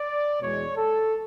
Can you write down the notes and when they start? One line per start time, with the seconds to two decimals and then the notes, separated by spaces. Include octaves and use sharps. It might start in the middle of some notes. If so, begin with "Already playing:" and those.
Already playing: D5
0.41 E2 B2 G#3 C#5
0.77 A4